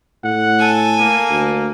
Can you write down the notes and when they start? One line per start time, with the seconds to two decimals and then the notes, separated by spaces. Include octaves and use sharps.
0.24 A2 F#5
0.59 A4 G#5
0.99 A#3
1.30 D2